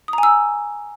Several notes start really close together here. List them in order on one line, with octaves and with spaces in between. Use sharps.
D#6 A#5 G#5 E6